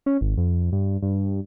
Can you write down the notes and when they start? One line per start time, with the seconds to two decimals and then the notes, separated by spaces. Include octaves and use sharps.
0.06 C#4
0.21 G#1
0.37 F2
0.72 G2
1.02 G2